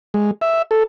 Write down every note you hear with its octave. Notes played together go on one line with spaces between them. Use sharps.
G#3
E5
A4